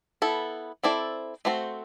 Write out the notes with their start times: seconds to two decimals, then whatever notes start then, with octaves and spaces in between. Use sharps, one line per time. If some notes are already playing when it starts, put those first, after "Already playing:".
0.22 B3 E4 A4
0.83 C4 E4 A4 D5
1.45 A3 C4 F#4 C5